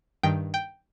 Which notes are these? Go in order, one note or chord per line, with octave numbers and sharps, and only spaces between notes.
G2 D#3 G5
G5